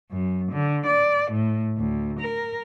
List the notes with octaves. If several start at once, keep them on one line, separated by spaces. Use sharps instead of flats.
F#2
D3
D5
A2
D2
A#4